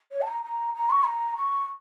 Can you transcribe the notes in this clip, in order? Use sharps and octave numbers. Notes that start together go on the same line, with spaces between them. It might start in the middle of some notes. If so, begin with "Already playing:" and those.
C#5
A5
A#5
A#5
A#5
C#6
A#5
C#6